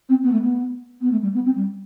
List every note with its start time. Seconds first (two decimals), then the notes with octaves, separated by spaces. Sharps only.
0.09 C4
0.23 B3
0.32 A3
0.42 B3
1.01 B3
1.11 A3
1.22 G3
1.34 B3
1.45 C4
1.55 G3